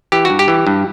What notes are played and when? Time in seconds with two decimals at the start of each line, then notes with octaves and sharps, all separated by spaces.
0.12 E3 G4
0.25 G2 F#4
0.39 G4
0.48 E3
0.67 G2